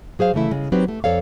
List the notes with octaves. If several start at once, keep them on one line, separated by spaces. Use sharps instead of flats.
F#3 G#4 C5 F5
C#3 E3 A3 E4
C#3 G#3
F#3 C4 D#4 G4 B4 C5
A3
F2 A4 C#5 D5 F5